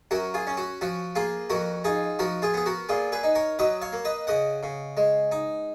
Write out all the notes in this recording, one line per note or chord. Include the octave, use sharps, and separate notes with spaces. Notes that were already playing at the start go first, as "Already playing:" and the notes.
F#2 F#4 A#4
F4 G#4
C#4
F#4
F3 F#4
A#3 F4 G#4
F2 F#4 A#4
D#4 F4 G#4
F3 F#4 A#4
F4 G#4
B3 G#4
F#4 A#4
A#2 F4 G#4
G#4 B4
D#4
A#4 C#5
F#3 B4 D#5
C#5 F5
A#3
B4 D#5
C#3 D#5 F#5
C#3
G#3
D#4